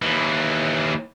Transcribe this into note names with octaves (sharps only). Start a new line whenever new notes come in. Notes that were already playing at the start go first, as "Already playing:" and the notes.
D#2 E3